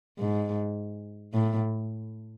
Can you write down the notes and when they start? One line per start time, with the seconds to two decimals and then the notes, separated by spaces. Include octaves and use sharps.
0.19 G#2
1.34 A2